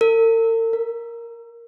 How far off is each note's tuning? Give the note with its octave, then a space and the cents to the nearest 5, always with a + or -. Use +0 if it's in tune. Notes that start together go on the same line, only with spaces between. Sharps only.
A#4 -45
A#4 +0